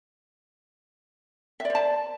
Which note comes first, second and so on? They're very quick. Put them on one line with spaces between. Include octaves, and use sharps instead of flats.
E5 D5 C5 A5